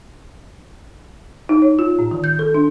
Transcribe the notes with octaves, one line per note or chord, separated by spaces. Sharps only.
D#4
C#5
F4
A2
D#3
G6
A4
D4